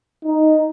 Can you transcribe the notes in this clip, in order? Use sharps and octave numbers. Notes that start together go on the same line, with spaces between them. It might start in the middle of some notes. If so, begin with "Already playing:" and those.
D#4